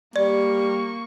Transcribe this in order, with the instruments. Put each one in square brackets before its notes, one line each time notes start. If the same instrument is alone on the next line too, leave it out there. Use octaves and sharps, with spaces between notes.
[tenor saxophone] G3 [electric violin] A#3 C#6 [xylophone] D5